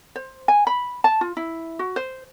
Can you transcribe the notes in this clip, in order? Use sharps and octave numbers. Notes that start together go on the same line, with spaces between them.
C5
G#5
B5
A5
F4
E4
F#4
C5